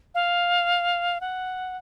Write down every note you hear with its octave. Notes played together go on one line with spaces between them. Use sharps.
F5
F#5